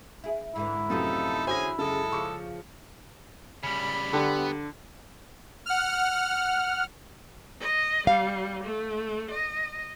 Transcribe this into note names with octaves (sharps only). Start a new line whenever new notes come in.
E4 G#4
G#2 D3 E3 E4
F#2 A2 C3 D#3 F3 B3 D#4 A4
E2 D3 C#4 F#4 G#4 C5 G#5 A#6
F#2 C#3 G#3 A4
C#3 F3 C#6 D6 C#7
C#3 G3 B5
D3 G3 B3
F#5 F6
D#5
G3 F5
A3
D#5